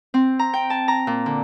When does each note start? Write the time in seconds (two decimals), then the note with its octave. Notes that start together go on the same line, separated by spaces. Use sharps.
0.14 C4
0.39 A#5
0.54 G5
0.70 A5
0.88 A#5
1.07 A#2
1.26 D3